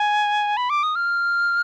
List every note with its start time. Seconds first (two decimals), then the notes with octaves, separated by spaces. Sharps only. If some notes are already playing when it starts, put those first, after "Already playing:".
Already playing: G#5
0.57 B5
0.70 D6
0.83 D#6
0.96 F6